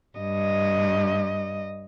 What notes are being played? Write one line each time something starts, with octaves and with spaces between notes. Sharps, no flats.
G2 D#5